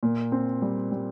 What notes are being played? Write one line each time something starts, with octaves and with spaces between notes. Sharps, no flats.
A#2
C4
G3
G3